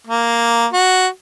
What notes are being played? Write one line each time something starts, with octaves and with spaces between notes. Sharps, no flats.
A#3
F#4